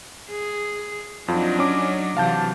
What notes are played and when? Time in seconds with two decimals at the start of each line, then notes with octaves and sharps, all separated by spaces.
0.29 G#4
1.28 F2 F#3 D4 D#4 F4
1.59 C#4 D6
2.17 C3 E3 F#3 F5 A5 G6